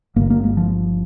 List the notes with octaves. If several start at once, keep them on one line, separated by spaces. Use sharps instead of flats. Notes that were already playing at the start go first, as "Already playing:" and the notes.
G1 G2 D3 A#3
A#3
G#3
F3